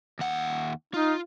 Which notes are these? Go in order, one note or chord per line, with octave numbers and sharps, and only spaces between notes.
D#2 F#5
D#4 F4